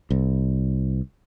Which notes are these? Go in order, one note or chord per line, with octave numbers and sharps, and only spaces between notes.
C2